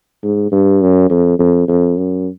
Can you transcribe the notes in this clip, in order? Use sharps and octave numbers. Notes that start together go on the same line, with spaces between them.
G#2
G2
F#2
F2
F2
F2
F#2